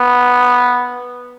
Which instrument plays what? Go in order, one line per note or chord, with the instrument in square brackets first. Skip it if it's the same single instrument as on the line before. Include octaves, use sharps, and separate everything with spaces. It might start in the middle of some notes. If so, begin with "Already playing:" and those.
Already playing: [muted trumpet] B3